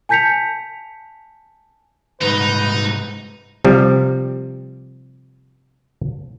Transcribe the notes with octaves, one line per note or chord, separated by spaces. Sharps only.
G#5 A5 G6 B6 C#7 F7
C2 G#2 D#4 B4
C3 F3 G3